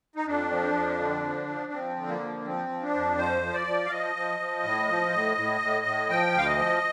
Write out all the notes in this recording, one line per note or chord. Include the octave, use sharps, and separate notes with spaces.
D#4
F2 D4
F3
F2
D3
F3
F3
F3 C4
D3
A#3
F3
F3 C4
F3
D4
F2
F3 C5
F3
D5
F3
F5
F3 D#5
F3
F3
A2
F3
A2
A2
A2
A2
F3 G5
D2 F5
D#5
F3